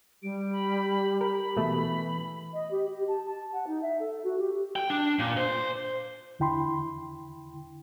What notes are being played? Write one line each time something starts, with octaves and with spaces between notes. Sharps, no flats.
G3 G4 D7
B5
A#4 B5
B2 E3 A3
D#5
G4
G4
A5
A5
F#5
D#4
E5
A4
F#4
G4
G5
D4
A#2
C5
E2 D3 E4 G5 B5 C6